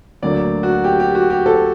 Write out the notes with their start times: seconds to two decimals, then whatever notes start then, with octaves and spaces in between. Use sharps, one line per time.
0.22 D2 D3 F#3 A#3 D5
0.63 F#4
0.84 G4
1.00 G4
1.15 F#4
1.30 G4
1.46 A4